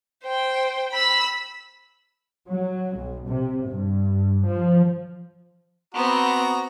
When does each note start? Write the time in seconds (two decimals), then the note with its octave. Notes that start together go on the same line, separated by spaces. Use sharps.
0.25 C5 G5
0.92 B5 E6
2.47 F#3
2.96 B1
3.28 C3
3.68 G2
4.44 F3
5.95 B3 C4 F#4 A#5